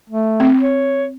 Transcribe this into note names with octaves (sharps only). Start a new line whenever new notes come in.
A3
C4
C#5